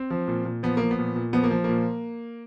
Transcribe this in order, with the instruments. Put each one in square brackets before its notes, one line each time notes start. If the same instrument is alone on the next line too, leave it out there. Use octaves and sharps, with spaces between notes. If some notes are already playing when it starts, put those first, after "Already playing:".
Already playing: [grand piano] C4
F3
A#2
A#2
F3 B3
F3 A#3
B3
A#2
A#2
F3 B3
A#3
F3
A#2 A#3